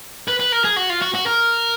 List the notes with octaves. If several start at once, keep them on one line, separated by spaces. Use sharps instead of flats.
B4
B4
A#4
G#4
F#4
F4
F#4
F#4
A#4